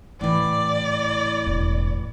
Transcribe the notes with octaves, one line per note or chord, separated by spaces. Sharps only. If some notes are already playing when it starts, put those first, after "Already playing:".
G#1 A2 C#3 E3 D5
E1